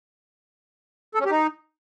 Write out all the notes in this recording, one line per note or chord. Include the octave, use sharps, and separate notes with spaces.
A4
C#4
G4
D#4